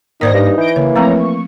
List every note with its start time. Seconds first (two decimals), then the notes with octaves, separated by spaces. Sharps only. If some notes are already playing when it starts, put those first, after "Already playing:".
0.21 G#2 D#3 A#3 D#4 C5 D5 D#5 A#6
0.34 G2 D#4
0.58 E3 G6 A#6 D7
0.76 C#3 A#3 C#5
0.96 F3 A3 C4 C#5 A#5
1.19 C#6